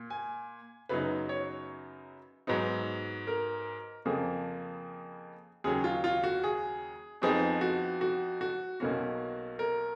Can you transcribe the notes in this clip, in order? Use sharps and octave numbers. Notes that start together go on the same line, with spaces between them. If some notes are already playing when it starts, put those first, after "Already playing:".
Already playing: A#2
G#5
F#2 C#3 F#3 B3 D#4 B4
C#5
G#2 F#3 B3 D#4
A#4
F2 C#3 F3 A#3 G#4
D#2 C#3 F#3 G#4
F4
F4
F#4
G#4
F2 F3 B3 D#4 G#4
F#4
F#4
F#4
B1 B2 A#3 C#4 F#4
A#4